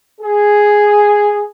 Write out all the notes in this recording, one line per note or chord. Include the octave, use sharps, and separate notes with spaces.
G#4